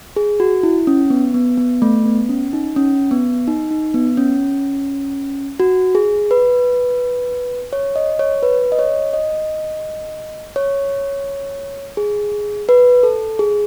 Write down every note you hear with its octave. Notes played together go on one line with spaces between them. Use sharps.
G#4
F#4
E4
C#4
B3
B3
B3
A3
B3
C#4
D#4
C#4
B3
D#4
D#4
B3
C#4
F#4
G#4
B4
C#5
D#5
C#5
B4
D#5
C#5
D#5
C#5
G#4
B4
A4
G#4